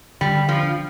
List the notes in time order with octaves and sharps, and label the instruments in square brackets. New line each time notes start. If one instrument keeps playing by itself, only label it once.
[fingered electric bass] D3 [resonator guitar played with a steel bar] G3
[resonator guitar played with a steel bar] F3
[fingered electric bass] D4